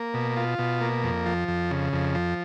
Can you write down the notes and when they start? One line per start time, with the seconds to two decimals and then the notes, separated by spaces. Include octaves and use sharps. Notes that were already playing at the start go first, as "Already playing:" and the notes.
Already playing: A#3
0.14 B2
0.37 F4
0.59 B2
0.81 A#3
1.04 F2
1.26 F3
1.48 F2
1.71 C#3
1.93 F2
2.15 F3